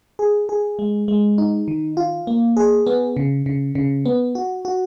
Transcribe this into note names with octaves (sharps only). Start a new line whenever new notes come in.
G#4
G#4
G#3
G#3
D#4
D#3
F4
A#3
G#4
B3
C#3
C#3
C#3
B3
F#4
F#4